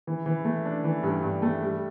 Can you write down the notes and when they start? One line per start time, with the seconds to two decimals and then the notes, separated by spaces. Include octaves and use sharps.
0.07 E3
0.26 E3
0.45 A3
0.65 D4
0.84 E3
1.03 G2
1.22 G2
1.42 A3
1.61 G3